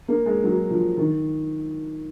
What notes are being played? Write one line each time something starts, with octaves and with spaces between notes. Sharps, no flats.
A#3
G#3
F#3
F3
D#3